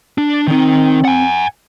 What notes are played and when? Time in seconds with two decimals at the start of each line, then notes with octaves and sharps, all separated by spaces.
0.18 D4
0.47 D#3 C4 D#4
1.05 F#5 G#5